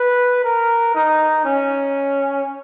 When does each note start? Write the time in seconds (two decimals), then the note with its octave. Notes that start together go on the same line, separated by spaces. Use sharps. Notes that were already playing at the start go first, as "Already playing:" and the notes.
Already playing: B4
0.44 A#4
0.95 D#4
1.45 C#4